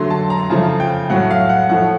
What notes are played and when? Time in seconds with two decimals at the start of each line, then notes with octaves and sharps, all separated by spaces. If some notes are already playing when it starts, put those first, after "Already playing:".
Already playing: D3 F#3 A3 C6
0.10 A5
0.30 A#5
0.49 C#3 F3 A3 A5
0.80 G5
1.10 A2 F#3 A3 F#5
1.30 F5
1.49 F#5
1.69 A2 F3 A3 F#5